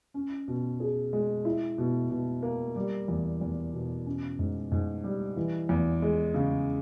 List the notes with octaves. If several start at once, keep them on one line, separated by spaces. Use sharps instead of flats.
C#4
B2
G#4
G#3
E4
B2
B2
A#3
G3
E2
E2
B2
C#4
G#2
G#2
G3
E3
E2
G#3
C#3